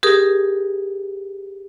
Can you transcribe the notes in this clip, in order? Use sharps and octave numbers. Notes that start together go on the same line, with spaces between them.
G4 G#4 A#4 D#6